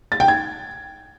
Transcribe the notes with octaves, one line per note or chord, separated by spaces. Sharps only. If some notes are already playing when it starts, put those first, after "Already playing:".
A6
G5
G#6